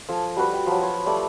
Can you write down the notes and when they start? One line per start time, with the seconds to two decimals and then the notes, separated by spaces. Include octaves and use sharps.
0.09 F3 A4 G#5 E6
0.36 G3 F#4 B4
0.53 G5
0.66 F3 F#3
0.82 F4 C#5
1.06 G3 A3 D5